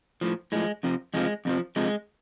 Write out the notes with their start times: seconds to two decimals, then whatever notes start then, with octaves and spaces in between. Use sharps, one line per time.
0.21 A2 F3
0.52 A2 F3 G#3
0.83 F2 C3 F3
1.14 F2 C3 F3 G#3
1.45 F2 C3 F3
1.76 F2 C3 F3 G#3